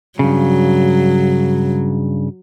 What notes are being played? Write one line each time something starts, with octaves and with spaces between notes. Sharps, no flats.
G2 C#3 F#3